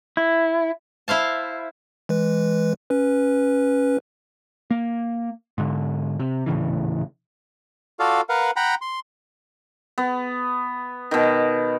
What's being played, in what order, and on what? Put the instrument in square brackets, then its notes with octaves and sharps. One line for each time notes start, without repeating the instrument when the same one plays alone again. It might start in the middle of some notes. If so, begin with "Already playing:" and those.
[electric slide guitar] E4
[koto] E4 C5 F5 A5
[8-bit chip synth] E3 G#3 B4
C#4 B4
[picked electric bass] A#3
G#2 D3
C3
D#1 A2 C#3 E3
[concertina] F4 F#4 A4 D5 F5
A#4 B4 F5 F#5
F#5 G5 A#5 B5
C6
[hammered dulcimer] B3
B2 D#3